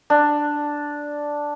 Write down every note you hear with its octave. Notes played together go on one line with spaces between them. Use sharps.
D4